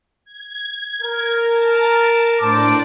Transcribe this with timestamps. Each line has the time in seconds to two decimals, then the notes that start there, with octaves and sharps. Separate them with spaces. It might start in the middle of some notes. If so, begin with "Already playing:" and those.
0.25 G#6
1.02 A#4
1.47 A5
2.40 A2 D4 C5 D5 A5 D6